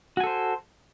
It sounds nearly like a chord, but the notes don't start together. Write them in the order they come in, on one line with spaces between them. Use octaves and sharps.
F#4 G#5 A4 C5